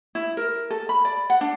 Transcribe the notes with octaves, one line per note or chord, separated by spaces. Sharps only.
E4
A#4
A4
B5
D5
F#5
D4